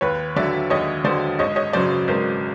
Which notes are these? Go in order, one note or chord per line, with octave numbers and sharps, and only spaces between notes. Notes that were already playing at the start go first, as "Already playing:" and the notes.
D#2 B4 C#5
D3 F#3 D5 E5
D#2 C#5 D#5
D3 F#3 C5 D5
G#1 C#5 D#5
C#5 D#5
F#2 C#3 F#3 C5 D5
G#1 A#4 C5